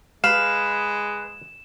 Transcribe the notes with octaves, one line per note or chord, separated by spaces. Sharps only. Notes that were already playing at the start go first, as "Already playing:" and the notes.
G#3 B4 F5 E7